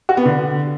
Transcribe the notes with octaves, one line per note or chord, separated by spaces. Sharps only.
F#4
B3
D3